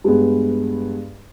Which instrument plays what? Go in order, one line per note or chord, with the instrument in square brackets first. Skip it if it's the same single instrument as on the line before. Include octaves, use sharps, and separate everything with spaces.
[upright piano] G2 G#3 B3